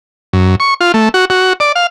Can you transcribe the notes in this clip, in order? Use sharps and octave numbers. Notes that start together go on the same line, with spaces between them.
F#2
C#6
F4
A3
F#4
F#4
D5
F5